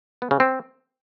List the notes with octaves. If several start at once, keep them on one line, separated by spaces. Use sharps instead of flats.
B3
C#3
C4